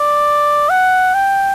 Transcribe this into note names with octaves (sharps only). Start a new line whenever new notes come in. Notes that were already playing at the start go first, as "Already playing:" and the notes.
Already playing: D5
F#5
G5